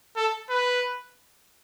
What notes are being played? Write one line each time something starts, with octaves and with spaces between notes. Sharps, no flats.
A4
B4